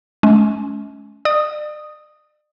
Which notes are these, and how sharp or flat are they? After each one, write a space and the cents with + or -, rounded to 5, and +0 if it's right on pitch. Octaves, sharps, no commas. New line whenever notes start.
G#3 +45 C#4 +15
D5 +40 D#6 +0